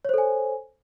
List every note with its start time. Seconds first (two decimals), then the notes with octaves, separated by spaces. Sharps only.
0.05 C#5
0.09 C5
0.14 A4
0.18 G#5